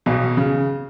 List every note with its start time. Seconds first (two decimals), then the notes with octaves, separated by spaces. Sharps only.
0.06 B1 B2
0.37 C#3